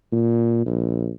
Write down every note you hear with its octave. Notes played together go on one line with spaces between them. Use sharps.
A#2
A#1